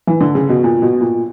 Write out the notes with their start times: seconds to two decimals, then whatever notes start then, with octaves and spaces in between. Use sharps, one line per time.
0.07 E3
0.20 D3
0.35 C#3
0.49 B2
0.64 A#2
0.82 B2
1.01 A#2